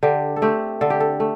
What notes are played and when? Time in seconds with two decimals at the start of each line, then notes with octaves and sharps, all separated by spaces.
0.03 D3 G4
0.36 A4
0.42 A3 C4 G4
0.81 D3 A4
0.90 G4
1.00 A4
1.20 A3